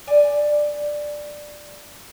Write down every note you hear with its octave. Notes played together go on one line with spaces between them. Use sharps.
D5 G#5